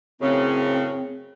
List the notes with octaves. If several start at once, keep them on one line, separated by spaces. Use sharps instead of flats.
F#2 A2 C#3 C4